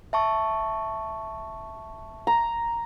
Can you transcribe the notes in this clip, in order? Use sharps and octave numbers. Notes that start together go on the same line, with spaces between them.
E5 A5 C#6
A#5